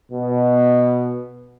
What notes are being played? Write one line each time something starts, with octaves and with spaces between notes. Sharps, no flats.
B2